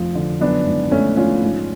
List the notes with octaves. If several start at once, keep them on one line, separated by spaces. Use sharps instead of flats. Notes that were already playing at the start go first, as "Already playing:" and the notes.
Already playing: F1 F2 F3
D3
F#2 B3 D4
G#1
G#1 A3 C#4
F3 C#4 F4
G#2